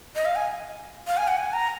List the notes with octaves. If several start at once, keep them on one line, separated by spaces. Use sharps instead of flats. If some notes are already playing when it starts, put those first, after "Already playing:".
D#5
F5
G#5
F5
G#5
F#5
G#5
A#5